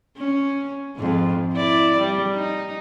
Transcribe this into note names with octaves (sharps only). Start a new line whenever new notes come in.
C#4
F2 G#2
E4 D5
G3
D#4